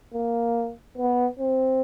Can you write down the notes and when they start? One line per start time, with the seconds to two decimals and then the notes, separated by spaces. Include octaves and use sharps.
0.14 A#3
0.98 B3
1.39 C4